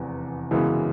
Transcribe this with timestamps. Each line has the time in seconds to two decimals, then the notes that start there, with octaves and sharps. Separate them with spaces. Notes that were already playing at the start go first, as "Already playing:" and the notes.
Already playing: F1 E2 C3 E3
0.51 F#2 C#3 E3 G#3 B3